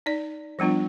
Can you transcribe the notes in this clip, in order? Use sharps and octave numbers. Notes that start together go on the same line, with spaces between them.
D#4 D5
F3 G3 B3 D4 F4